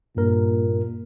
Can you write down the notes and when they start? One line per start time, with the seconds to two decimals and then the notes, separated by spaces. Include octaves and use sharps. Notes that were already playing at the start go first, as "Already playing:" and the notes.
0.17 G2 A#2 A#4